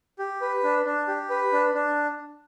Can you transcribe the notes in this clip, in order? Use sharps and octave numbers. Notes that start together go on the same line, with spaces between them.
G4
B4
D4
D4
G4
B4
D4
D4